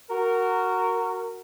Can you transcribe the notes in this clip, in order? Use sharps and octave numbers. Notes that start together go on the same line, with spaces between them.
F#4 A#4